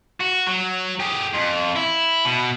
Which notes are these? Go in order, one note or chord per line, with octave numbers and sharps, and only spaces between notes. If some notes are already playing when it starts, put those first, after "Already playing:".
F#4
F#3
G4 G#4
F2
E4
B2